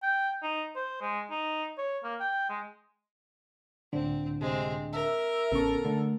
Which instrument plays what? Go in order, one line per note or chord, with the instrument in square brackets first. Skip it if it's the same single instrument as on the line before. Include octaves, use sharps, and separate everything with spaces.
[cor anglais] G5
D#4
C5
G#3
D#4
C#5
A#3
G5
G#3
[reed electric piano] C#2 A2 D3 [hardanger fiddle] C4 [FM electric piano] D4
[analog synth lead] C3 [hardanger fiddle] G#3 C4
[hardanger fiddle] A#4 [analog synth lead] E5
[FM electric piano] A1 C#4 C#6 [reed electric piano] C#3 B3 [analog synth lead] A4
[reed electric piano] D3 [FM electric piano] A3